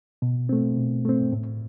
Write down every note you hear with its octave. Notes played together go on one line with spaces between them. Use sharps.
B2
A3 C4
B2
A3 C4
A2